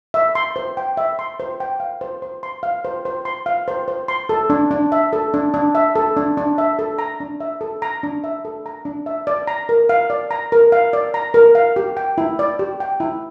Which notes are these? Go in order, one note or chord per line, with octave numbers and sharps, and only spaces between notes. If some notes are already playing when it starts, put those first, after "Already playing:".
E5
C6
C5
G5
E5
C6
C5
G5
F5
C5
C5
C6
F5
C5
C5
C6
F5
C5
C5
C6
A4
D4
D4
E5
A4
D4
D4
E5
A4
D4
D4
E5
A4
A#5
D4
E5
A4
A#5
D4
E5
A4
A#5
D4
E5
D5
A#5
A#4
F5
D5
A#5
A#4
F5
D5
A#5
A#4
F5
G4
G5
E4
D5
G4
G5
E4